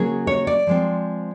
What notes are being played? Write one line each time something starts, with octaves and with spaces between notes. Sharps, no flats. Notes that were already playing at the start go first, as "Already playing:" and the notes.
Already playing: C#3 F#3 A#3 C#4 G#4
C#5
D5
F3 G#3 C4